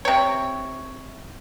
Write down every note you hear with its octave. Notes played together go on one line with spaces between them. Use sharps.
C3 C#5